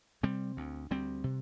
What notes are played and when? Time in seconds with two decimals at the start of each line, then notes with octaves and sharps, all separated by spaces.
0.23 C3 G3 C4
0.57 D2
0.91 D2 G3 C4
1.24 C3